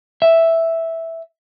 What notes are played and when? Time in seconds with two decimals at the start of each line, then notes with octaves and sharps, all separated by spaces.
0.22 E5